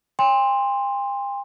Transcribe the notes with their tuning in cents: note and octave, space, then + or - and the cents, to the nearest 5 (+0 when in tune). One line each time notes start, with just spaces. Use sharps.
G5 +45 C6 +5